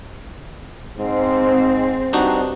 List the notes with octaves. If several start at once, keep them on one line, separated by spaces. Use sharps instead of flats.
G#2 C4
G2 D4 D#4 F#4